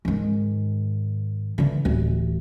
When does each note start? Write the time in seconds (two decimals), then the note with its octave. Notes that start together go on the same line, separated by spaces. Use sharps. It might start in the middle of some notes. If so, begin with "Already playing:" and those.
0.05 G#2 D#3
1.58 D3 E3
1.85 D1 A1